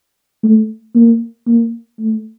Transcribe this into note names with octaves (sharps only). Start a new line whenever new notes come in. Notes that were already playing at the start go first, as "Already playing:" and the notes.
A3
A#3
A#3
A3